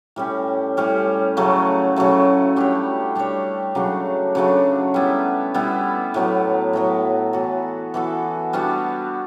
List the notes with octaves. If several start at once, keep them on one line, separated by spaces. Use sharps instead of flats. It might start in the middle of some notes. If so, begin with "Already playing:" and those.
A2 G3 C#4
A2 G3 C#4
C#3 F#3 A3
C#3 F#3 A3
G3 D4 G4 C#5
G3 D4 G4 C#5
C#3 F#3 A3 D4
C#3 F#3 A3 D4
G3 B3 E4
G3 B3 E4
A2 F#3 B3
A2 F#3 B3
E3 B3 F#4 A4
E3 B3 F#4 A4
G3 B3 D4 F#4